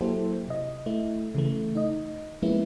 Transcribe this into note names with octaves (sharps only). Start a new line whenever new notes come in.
F#3 A#3 E4 G4 A4 C5
C3 D#5
A3 E4
C#3 E3 A3
D#4 D#5
F3 G#3 A#3 B3 C#4 E4